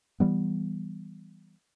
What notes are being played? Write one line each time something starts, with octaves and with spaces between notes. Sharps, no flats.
E3 G3 B3